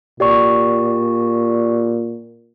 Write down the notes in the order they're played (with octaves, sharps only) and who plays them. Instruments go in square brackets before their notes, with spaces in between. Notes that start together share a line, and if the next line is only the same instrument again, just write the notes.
[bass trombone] A#2 [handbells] G4 D5 C#6